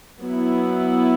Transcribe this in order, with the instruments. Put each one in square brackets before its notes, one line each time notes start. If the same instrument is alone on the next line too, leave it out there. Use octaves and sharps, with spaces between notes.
[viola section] F#3 B3 E4